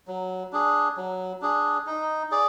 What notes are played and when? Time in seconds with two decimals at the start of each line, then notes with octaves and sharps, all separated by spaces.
0.08 F#3
0.53 D4 G#4
0.97 F#3
1.42 D4 G#4
1.87 D#4
2.31 G#4 D5